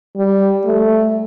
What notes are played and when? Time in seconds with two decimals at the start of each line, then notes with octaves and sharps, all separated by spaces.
0.16 G3
0.65 A3